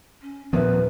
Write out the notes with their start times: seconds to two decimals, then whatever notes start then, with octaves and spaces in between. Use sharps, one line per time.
0.21 C#4
0.53 D#1 F3 B3 A#4 B4 E5